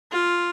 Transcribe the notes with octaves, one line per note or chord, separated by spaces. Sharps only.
F4